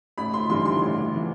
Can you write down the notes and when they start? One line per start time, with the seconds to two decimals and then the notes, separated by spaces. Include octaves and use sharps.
0.18 A1 B5
0.34 C6
0.50 G2 E3 C6
0.65 C6
0.82 A1
1.16 E3